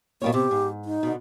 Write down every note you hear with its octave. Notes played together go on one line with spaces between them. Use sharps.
B2 G3 A#3 C#5
C3 G4
G#2
D#4
B2 D3